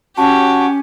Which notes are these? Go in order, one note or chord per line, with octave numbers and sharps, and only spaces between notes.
C#4 F#4 G4 A5